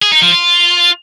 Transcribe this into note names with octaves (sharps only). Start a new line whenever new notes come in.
G#4
D#4
F3
F4